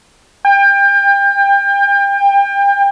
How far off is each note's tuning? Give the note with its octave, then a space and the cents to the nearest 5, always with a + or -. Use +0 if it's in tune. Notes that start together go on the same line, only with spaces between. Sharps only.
G5 +30